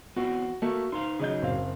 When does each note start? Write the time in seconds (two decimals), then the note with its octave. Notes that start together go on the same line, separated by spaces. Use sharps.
0.17 B3 C4 E4 F#4
0.62 A3 A#3 F#4 A4
0.92 D#4 C5 F5 C6
1.19 C#3 F#3 D#4 G#4 G6
1.42 F#1 C4 F5